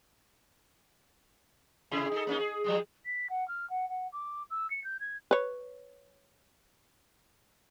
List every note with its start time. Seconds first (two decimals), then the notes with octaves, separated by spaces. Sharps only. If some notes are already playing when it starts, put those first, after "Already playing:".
1.91 C3 E4 G#4
2.12 D#4 G#4 A4
2.27 A#3 C#4 D#4
2.39 G#4
2.64 F3 G3 G#3
3.06 B6
3.30 F#5
3.48 F6
3.70 F#5
3.89 F#5
4.13 D6
4.50 E6
4.70 C#7
4.84 G6
5.00 G#6
5.31 B4 C#5